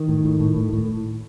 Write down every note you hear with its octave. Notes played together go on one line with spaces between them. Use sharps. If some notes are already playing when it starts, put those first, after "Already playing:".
Already playing: D#3
A2
A2
A2
A2
A2